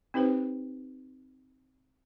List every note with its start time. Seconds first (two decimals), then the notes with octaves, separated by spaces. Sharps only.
0.14 C4 D#4 G4 B4 C5